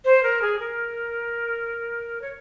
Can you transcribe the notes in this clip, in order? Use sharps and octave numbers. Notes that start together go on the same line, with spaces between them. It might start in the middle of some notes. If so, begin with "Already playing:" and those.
C5
A#4
G#4
A#4
C#5